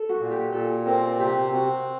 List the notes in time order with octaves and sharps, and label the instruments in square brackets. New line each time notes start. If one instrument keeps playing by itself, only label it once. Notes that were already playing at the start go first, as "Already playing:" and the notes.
Already playing: [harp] A4
F#4
[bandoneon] A#2
[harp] G4
[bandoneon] A#2 [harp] A4
[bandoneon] C4 [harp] A#4
[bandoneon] C3 [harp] G4
[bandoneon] C4 [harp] F#4